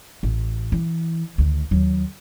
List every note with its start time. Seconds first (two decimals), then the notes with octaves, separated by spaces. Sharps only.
0.23 A1
0.72 E3
1.38 D2 D#3
1.71 D#2 F#3